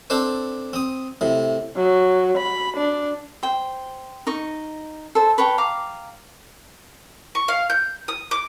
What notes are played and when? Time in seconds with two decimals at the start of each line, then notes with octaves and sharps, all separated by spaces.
0.10 C4 D4 A4 C5
0.73 C4 D#6
1.21 A2 C3
1.77 F#3
2.37 B5
2.77 D4
3.43 C5 G5
4.27 D#4 D#5 C#6
5.15 A4 C5
5.38 B4 C#5 G5 A5
5.58 F5 A#5 D6
7.35 C#6
7.48 F5
7.70 G6
8.08 D#6
8.31 D6